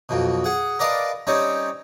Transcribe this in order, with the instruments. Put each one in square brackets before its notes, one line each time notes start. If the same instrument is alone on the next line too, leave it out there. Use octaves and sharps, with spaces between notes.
[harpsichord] B1 F2 B2
G#4 F#5
A#4 B4 D5 D#5 F5 A5
G3 C4 C#4 D#4 C#5